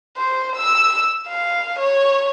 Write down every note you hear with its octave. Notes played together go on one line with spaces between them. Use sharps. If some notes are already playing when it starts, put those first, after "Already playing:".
C5
E6
F5
C#5